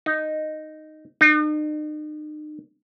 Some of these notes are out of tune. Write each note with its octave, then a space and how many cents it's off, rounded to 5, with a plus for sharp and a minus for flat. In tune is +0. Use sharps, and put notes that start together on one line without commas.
D#4 -5
D#4 -40